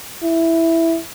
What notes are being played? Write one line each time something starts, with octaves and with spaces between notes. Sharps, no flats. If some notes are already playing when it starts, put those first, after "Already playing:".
E4